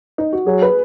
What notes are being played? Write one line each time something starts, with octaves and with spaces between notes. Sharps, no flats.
D#4
F#4
F#3 G#4
B4